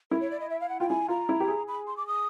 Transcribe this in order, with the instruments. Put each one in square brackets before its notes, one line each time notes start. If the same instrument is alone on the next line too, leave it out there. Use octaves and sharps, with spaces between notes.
[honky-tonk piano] E4 [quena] A#4
[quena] C#5
D5
D#5
E5
F5
F#5
[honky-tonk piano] F4 [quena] G5
[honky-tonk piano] E4 [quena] G#5
[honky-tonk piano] F4 [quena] A#5
[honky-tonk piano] E4
G4
G#4
[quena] B5
C6
D6
D#6